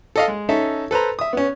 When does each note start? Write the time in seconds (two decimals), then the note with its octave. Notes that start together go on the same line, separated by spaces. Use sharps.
0.16 A4 D#5 F5
0.28 G#3
0.49 C#4 D#4 A4 E5
0.91 A4 B4 C5 A#5
1.19 E5 D#6
1.33 B3 C#4